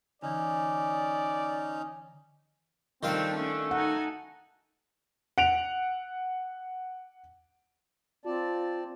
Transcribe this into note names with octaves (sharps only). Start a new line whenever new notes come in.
D3 E3 C#4 D#4 D5
D#3 G3 A3 C4 D4 F4 C6
A3 C#4 D4
D#4 A4 F#5 G#5
F#5 D7 F7
C4 F4 D5 A5